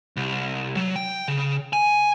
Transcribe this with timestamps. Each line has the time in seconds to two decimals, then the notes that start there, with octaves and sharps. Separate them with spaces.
0.17 C2
0.77 F#3
0.96 G5
1.28 C#3
1.73 G#5